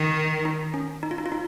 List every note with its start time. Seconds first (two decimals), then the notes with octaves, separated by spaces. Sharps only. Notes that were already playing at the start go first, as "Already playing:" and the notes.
Already playing: D#3 D#4
0.45 D#4
0.74 C#4
1.03 D#4
1.11 F4
1.18 D#4
1.26 F4
1.32 D#4